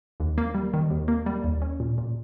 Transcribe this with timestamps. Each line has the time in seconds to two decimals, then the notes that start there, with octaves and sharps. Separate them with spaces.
0.20 D#2
0.38 A#3
0.55 G3
0.74 D#3
0.90 D#2
1.08 A#3
1.26 G3
1.44 D#2
1.62 C#4
1.80 A#2
1.98 A#2